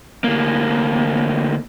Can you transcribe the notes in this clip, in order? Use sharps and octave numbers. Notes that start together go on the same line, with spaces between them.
D2 A#3